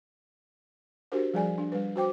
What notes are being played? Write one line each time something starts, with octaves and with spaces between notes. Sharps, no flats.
D4 F#4 G4 A#4 C5
F3 G3 G#4 D5 G#5
D4
G3 B4
F#4 C5 G5 D6